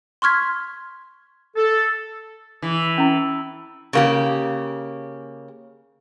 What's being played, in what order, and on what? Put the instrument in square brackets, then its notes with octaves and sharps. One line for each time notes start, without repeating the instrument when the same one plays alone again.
[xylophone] C6 C#6 F6 G#6 B6
[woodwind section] A4
[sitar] E3
[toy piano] C#4 E4
[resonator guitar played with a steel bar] C#3 A#3 G4